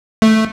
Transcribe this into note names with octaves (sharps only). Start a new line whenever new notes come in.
A3